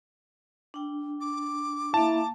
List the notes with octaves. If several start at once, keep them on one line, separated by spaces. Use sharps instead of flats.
D4 G5
D6
A#3 E4 F5 A5